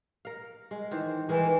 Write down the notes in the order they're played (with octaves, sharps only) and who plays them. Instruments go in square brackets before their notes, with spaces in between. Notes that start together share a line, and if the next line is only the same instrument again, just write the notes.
[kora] A#4 F5
G#3
D#3 E3 C5
[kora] D#3 G#3 [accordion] E3